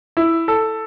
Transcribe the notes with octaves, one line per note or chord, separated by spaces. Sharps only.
E4
A4